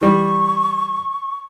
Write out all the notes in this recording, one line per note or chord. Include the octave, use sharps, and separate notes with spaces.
E3 G3 C#6